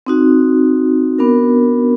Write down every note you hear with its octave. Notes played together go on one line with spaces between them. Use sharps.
C4 D#4 F#4
B3 D4 F#4 A#4